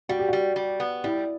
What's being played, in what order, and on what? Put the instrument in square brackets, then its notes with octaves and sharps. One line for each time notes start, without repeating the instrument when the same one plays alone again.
[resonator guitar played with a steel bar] G3 [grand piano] F#4
[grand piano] G4
[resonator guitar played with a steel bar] G3 [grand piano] F#4
[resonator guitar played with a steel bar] G3
B3
[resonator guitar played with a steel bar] G3 [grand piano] E4